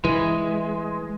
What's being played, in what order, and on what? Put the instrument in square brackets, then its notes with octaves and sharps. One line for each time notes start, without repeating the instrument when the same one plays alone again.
[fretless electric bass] E3 [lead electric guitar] G#3